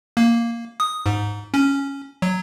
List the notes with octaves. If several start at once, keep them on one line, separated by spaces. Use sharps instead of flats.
A#3
D#6
G#2
C#4
F#3